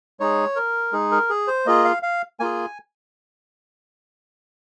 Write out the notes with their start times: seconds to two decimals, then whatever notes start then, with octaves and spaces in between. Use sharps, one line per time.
0.20 G#3 D#4 G#4 C#5
0.56 A#4
0.92 G#3 D#4 G#4
1.12 A#4
1.30 G#4
1.48 C5
1.66 A#3 F4 G#4 D#5
1.85 F5
2.03 F5
2.40 A#3 F4 G#4 G#5